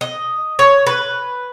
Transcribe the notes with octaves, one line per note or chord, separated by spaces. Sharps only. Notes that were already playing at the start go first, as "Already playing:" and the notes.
D#5
C#5
B4